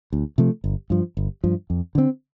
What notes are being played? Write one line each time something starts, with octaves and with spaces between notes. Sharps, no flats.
D2
C3 F3 A3
G1
G2 F3
G1
G2 F3
F2
D3 A3 C4